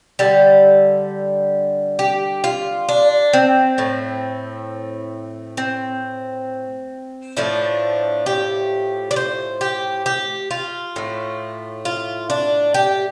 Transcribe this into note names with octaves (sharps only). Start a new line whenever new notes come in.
D3 G3 A4
G4
F4
D4
C4
A2 A3
C4
A2 F3 A3 D4
G4
D5
C5
G4
G4
F4
A2 A3
F4
D4
G4